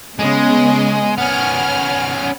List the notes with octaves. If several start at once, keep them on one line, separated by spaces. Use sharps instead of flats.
C#3 G#3 B3 D#5
B3 C#4 F#5 F6